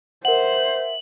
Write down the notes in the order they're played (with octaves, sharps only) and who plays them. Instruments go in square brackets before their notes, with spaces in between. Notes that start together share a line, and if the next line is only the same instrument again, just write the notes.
[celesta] A#4 F#5 [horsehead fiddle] C5 [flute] E5 [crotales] F#7